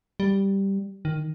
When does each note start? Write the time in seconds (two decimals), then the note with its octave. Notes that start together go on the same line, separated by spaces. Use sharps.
0.20 G3
1.05 D#3